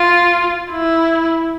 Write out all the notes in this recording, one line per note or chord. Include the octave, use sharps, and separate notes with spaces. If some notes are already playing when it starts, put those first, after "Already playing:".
Already playing: F4
E4